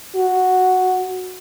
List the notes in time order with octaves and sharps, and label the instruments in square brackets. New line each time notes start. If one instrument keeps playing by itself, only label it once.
[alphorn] F#4